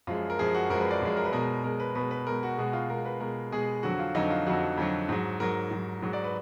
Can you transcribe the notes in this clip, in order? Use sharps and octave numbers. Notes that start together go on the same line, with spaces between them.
F#2 F3 G#3 F4
A#4
F#2 F3 G#3 G#4
F#4
F#2 F3 G#3 A#4
B4
D5
F#2 F3 G#3
A#4
B4
B2 G#3 A#4
B2 G#3 A#4
B4
B2 G#3 B4
B4
B2 G#3 A#4
F#4
B2 G#3 F#4
F4
B2 G#3 A#4
B4
B2 G#3 A#4
B2 G#3 G#4
F2 D3 F#3 F#4
F4
F2 D3 F#3 D#4
F4
F2 D3 F#3 F#4
F2 D3 F#3
G#2 F#3
G#2 F#3 A#4
G#2 F#3
G#2 F#3
D5
B4